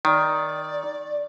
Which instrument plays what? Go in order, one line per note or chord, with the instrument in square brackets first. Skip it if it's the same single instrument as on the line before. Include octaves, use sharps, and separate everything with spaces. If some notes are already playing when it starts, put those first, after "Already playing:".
[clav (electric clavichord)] D#3 [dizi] D5